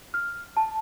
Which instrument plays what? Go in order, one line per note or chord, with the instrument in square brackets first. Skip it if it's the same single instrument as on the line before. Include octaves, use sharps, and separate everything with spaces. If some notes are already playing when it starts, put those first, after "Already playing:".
[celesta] F6
A5